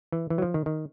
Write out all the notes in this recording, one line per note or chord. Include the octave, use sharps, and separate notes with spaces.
E3
E3
F#3
F3
D#3
D#3